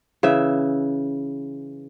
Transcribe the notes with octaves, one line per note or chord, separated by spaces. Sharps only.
C#3 E3 E5